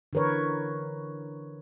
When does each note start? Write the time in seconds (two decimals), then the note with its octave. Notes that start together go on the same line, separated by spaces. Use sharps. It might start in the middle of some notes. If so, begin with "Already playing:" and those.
0.13 D3 E3 A#4 B4 C#5